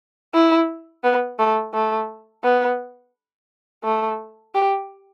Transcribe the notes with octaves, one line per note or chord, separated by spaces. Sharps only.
E4
B3
A3
A3
B3
A3
G4